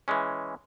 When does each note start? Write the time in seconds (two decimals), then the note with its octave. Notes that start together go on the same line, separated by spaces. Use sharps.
0.08 E3 G#3 C#4